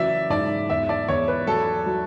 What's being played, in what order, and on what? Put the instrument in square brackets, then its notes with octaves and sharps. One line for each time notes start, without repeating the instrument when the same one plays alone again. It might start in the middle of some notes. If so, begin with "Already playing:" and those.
Already playing: [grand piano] C#3 E3 F#3 [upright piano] D5 E5
[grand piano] G#2 [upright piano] D5
[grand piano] E2 [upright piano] E5
[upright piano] D5
[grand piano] E2 [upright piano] C#5
[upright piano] B4
[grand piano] F#3 [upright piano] A4
[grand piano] F#3